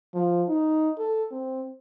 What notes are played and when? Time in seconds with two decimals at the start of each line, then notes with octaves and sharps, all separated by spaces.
0.15 F3
0.48 D#4
0.98 A4
1.32 C4